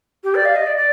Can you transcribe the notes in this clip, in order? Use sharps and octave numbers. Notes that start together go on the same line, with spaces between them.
G4
D5
F5
D#5
D5
D5